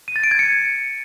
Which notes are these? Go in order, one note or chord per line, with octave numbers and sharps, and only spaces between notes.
D#7
A6
D7
G#6
C#7